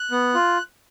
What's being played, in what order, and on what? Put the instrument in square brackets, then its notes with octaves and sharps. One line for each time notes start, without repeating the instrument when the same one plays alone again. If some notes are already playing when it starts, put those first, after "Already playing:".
Already playing: [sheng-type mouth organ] F#6
B3
F4